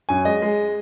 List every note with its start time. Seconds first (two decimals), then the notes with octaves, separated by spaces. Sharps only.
0.09 F#2 G#5
0.25 G#3 D#5
0.42 G#3